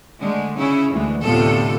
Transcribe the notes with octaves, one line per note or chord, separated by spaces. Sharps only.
D3 G#3 A3
C#3 C#4 E4
D2 E3 G#3
D2 A2 C3 B3 F4 A4